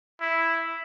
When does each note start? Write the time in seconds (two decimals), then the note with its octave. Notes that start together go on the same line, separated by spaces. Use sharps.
0.21 E4